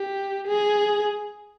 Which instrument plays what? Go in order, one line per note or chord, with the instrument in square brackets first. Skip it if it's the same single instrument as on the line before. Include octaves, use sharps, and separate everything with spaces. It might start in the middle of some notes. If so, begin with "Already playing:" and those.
Already playing: [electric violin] G4
G#4